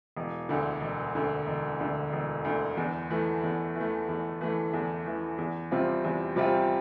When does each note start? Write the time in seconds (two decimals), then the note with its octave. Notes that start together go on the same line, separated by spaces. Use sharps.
0.17 E1
0.49 D2 D3
0.81 E1
1.15 D2 D3
1.47 E1
1.80 D2 D3
2.13 E1
2.45 D2 D3
2.77 E2
3.10 E3 A3
3.43 E2
3.75 E3 A3
4.08 E2
4.41 E3 A3
4.73 E2
5.07 E3 A3
5.38 E2
5.71 C3 G3 C4 F4
6.04 E2
6.36 C3 G3 C4 F4